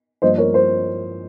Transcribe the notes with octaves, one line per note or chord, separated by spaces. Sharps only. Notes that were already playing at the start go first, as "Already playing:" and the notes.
G2 F3 A#3 C5 D#5
A#4 C#5
C5